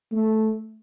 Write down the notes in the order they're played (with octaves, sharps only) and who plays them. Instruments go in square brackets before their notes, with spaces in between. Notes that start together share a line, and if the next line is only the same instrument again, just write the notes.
[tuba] A3